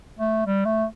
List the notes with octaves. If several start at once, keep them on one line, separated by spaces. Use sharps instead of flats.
A3
G3
A3